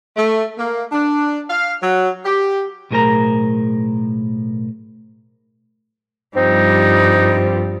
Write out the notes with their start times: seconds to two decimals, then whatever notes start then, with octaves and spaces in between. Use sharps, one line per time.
0.16 A3
0.58 A#3
0.91 D4
1.49 F5
1.81 F#3
2.24 G4
2.91 B1 A2 G#4 A#4 C5 A#5
6.36 G2 F3 G3 C4 D#4